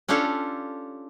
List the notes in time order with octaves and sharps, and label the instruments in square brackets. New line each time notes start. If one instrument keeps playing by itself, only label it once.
[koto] C#4 D4 F4 G4 A4 C#5